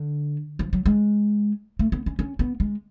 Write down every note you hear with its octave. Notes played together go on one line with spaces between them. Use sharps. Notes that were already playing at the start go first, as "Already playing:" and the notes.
Already playing: D3
F3
F#3
G#3
A3
B3
C#4
C#4
B3
G#3